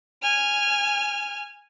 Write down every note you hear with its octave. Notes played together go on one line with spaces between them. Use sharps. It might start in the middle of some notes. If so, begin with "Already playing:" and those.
G#5 F6